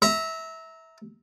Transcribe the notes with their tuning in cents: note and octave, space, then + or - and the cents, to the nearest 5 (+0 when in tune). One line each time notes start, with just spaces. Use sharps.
E5 -20 A#5 +0